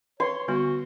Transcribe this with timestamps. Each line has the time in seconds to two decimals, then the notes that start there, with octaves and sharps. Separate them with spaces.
0.20 B4 C#5 C6
0.48 D3 G3 B3 F#4